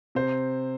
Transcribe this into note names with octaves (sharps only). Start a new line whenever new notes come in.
C3 C5